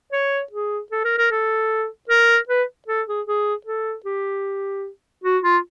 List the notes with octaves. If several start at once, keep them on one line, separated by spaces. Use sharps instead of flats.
C#5
G#4
A4
A#4
A#4
A4
A#4
B4
A4
G#4
G#4
A4
G4
F#4
F4